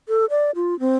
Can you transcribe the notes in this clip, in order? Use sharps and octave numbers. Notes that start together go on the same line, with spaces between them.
A4
D5
F4
C4